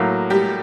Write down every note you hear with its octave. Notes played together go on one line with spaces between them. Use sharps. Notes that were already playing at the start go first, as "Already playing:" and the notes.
Already playing: A2 F#3 A#3
G3 G4